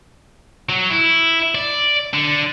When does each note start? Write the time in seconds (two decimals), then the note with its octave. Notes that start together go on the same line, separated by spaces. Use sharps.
0.69 F#3
0.90 E4
1.55 D5
2.14 D3